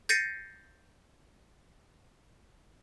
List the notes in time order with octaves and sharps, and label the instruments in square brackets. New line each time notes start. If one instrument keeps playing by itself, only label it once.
[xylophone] G6 A6 A#6 C7 C#7 D#7